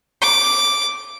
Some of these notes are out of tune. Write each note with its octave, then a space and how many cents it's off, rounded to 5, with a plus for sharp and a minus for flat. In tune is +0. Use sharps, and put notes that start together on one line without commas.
D6 -5